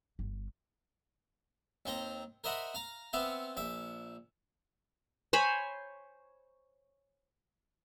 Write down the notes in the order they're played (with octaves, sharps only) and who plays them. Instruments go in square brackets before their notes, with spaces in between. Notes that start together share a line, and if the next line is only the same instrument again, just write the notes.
[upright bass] G1
[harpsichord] D#2 C4 G5 A#5
A#4 C5 D#5 E5 F#5 B5
F5 A#5
B3 C4 E5 F5
A#1 E5 D6
[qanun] C5 C#5 G#5 B5